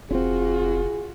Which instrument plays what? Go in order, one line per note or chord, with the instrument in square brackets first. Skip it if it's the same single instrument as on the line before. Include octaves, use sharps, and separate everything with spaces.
[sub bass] F1 [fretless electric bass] C4 C#4 [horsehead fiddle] F4 F#4 [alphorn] G#4